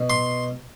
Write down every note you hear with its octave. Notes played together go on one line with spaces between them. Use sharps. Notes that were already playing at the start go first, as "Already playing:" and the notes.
Already playing: B2
C6